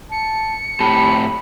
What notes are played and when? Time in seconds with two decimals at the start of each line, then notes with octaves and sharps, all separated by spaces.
0.12 A5 C#7
0.80 A2 C4 G4 A5 B5